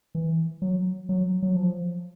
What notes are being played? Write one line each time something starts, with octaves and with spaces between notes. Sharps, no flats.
E3
F#3
F#3
F#3
F3